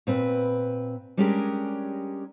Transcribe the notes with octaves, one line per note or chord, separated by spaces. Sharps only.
A#2 C4 B4
G3 G#3 C#4 D4 G4 A#4